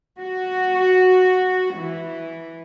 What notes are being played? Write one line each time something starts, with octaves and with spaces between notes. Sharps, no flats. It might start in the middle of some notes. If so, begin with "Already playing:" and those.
F#4
E3